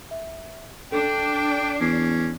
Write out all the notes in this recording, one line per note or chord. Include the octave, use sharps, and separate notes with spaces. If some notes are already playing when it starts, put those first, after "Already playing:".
E5
D4 A4 G5
E2 C#4 C7